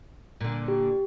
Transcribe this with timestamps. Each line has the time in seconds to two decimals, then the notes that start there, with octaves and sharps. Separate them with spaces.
0.41 A#2 D3
0.68 G4